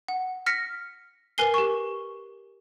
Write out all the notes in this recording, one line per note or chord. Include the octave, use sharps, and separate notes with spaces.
F#5
F6 A#6 B6 C#7
A#4 B4 G#5 C7 G7
G4 C#6